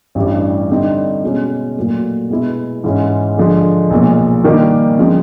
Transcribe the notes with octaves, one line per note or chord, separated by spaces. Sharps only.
A1 G2 E3 G3
D3 G3 C4 D#4
B2 G#3 C#4 F#4
A#2 F#3 A3
B2 G#3 B3 E4
G#2 E3 G#3 C#4
D3 F3 G#3
B1 A#2 F3 G#3
D#3 G3 A#3 D#4 G4
C#3 F3 G#3 C4